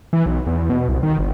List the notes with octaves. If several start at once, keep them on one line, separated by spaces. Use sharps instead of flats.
E3
B1
E2
B2
C2
D#3
G1